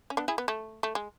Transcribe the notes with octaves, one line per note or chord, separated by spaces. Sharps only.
C#4
B3 D4
E4 G#4
B3
A3
A3
G#3